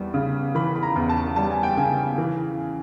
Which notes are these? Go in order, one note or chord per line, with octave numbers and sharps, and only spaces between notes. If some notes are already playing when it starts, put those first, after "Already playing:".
Already playing: E2 G3
C#3
E3 B5
B5
A#5
E2
A5
G3 A5
G#5
G5
C#3 G#5
E3